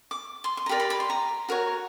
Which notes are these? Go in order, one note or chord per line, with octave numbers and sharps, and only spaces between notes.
D6
C6
C6
A#5
G4 A#4 D5 B5
B5
B5
C6
A#5
F#4 A#4 C#5